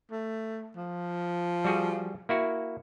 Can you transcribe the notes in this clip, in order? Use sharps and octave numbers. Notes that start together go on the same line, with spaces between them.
A3
F3
G3 F#4 G#4
A#3 E4 F#4